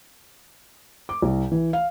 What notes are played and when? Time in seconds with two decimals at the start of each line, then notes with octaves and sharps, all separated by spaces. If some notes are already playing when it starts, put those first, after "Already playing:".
1.09 D6
1.22 C2
1.51 E3
1.73 F5